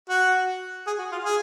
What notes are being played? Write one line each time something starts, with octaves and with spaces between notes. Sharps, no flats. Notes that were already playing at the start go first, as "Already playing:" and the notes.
F#4
G#4
F#4
F4
G#4